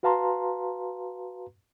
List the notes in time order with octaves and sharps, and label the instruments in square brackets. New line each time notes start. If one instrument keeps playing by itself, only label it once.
[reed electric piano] F#4 B4 F5 A5 A#5 C6